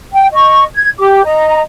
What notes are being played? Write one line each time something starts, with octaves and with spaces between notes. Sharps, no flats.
G5
D#5 C#6
G#6
G4 D6
D#5 A#5